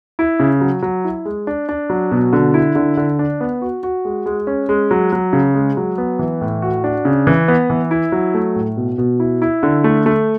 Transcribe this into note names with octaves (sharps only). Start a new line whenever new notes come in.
E4
C#3
F#3
F#3
E4
G#3
D4
D4
F#3
B2
D3
E4
D3
D3
D4
B3
F#4
F#4
G#3
G#3
C#4
G#3
F#3
F#3
C#3
G#3
F#3
B3
E3
A2
F#4
D4
C#3
E3
B3
E3
E4
F#3
A3
A2
B2
B2
E4
E4
D3
A3
A3